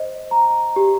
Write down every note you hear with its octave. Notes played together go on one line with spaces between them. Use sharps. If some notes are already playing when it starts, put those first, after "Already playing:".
Already playing: C5 D#5
A#5
G4